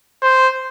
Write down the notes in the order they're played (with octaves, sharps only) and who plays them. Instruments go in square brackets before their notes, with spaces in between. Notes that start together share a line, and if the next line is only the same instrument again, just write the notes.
[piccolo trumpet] C5